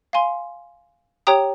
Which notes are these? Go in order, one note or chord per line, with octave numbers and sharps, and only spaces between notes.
F5 G#5 C6
G4 C#5 G5 A#5 D#6